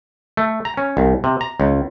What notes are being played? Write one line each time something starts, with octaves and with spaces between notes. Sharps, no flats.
A3
A#5
C#4
C2
C3
A#5
C#2